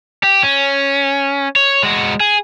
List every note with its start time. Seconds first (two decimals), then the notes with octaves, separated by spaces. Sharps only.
0.23 G4
0.43 C#4
1.56 C#5
1.83 G#3 F#4
2.20 G#4